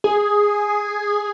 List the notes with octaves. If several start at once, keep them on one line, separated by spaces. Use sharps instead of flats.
G#4